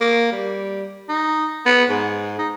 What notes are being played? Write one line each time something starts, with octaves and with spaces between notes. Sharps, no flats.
A#3
G3
D#4
B3
G#2
D#4